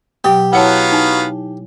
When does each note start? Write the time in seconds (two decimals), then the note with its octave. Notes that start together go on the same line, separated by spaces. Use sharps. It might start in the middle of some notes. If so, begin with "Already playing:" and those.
0.24 B2 F#3 G4 G5
0.53 F#3 B3 E4 C#5 F5 F#5 A5
0.92 D#4 G#5